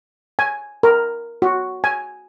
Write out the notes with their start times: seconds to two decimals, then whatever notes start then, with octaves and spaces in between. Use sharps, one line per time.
0.39 G#5
0.83 A#4
1.42 F#4
1.84 G#5